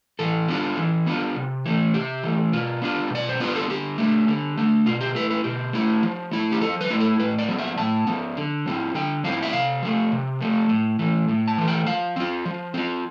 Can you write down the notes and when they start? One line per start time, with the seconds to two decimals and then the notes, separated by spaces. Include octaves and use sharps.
0.19 E3 A4
0.49 B3 D4 F4
0.77 E3
1.07 B3 D4 F4
1.36 C3
1.66 E3 A3
1.94 C3 G4
2.23 E3 A3
2.53 B2 F4
2.82 B3 D4 F4
3.10 B2 D5
3.29 C5
3.40 B3 D4 F4 B4
3.55 A4
3.69 D3 G4
3.98 A3 D4
4.28 D3
4.57 A3 D4
4.86 B2 F4
5.01 G4
5.15 A3 E4 B4
5.31 B4
5.44 B2 G4
5.73 A3 E4
6.03 F3
6.31 A3 E4
6.52 G4
6.61 F3 A4
6.81 B4
6.90 A3 E4
7.00 A4
7.20 A2 B4
7.39 D5
7.48 F3 B3
7.59 E5
7.77 A2 A5
8.07 F3 B3
8.37 D3
8.66 F3 C4 E4
8.94 D3 G5
9.24 F3 C4 E4 F5
9.43 E5
9.53 C3 F5
9.82 F3 A3
10.12 C3
10.40 F3 A3
10.69 A2
10.99 E3 A3
11.28 A2
11.48 A5
11.58 E3 A3
11.68 G5
11.86 F3 F5
12.16 C4 F4
12.45 F3
12.74 C4 F4